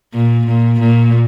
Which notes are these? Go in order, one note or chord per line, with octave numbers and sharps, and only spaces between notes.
A#2
A#2
A#2